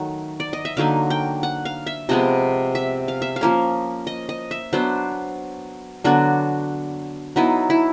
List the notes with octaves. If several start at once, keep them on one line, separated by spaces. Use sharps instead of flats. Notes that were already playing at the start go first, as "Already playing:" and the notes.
Already playing: D#3 F#3 A3
D5
D#5
E5
D3 F#3 A#3 D#4 F5
G5
F#5
F5
E5
C3 F3 G#3 B3 D#5
E5
F5
E5
F5
F3 A#3 C#4
D#5
D#5
E5
F#3 B3 D4 C5
D3 F#3 B3 D4 F#4
F#3 B3 D#4 E4
E4